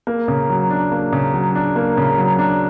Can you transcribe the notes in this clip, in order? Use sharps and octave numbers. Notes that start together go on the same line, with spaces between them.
A#3
C#3
F#3
D4
A#3
C#3
F#3
D4
A#3
C#3
F#3
D4